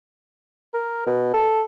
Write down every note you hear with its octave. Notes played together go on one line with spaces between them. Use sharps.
A#4
B2
A4